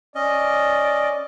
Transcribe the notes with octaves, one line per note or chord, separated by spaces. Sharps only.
C#4 D5 D#5